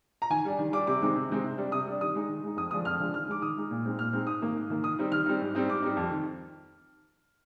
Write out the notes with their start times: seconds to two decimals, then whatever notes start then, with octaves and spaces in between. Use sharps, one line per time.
0.22 A#5
0.30 D#3 G#5
0.45 G3 D4
0.59 D#3
0.73 G3 D4 D6
0.87 C3 D6
1.02 D#3 G#3 C4 D#4
1.16 C3
1.30 D#3 G#3 C4 D#4
1.44 C3
1.58 G3 D4
1.72 C3 D#6
1.87 G3 D4
2.01 D#3 D#6
2.15 G#3 D#4
2.29 D#3
2.44 G#3 D#4
2.57 F2 D#6
2.71 D3 F3 G#3 D4 D#6
2.85 F2 F6
2.99 D3 F3 G#3 D4
3.14 D#3 F6
3.27 G#3 D#4 D6
3.42 D#3 D#6
3.57 G#3 D#4
3.71 A#2
3.85 G#3 C4 D#4
3.99 A#2 F6
4.13 G#3 C4 D#4
4.27 G#2 D#6
4.42 D#3 A#3
4.56 G#2
4.70 D#3 A#3
4.84 D#3 D#6
4.99 G3 C4 D#4
5.12 D#3 F6
5.26 G3 C4 D#4
5.41 G#2
5.55 G3 C4 D#4
5.68 G#2 D6
5.83 G3 C4 D#4
5.97 F2
6.11 D#3